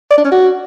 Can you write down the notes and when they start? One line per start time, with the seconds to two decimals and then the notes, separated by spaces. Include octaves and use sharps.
0.11 D5
0.18 D4
0.25 C#4
0.32 F#4